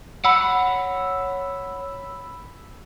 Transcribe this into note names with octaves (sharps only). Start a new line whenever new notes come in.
C#5 F#5 B5 E6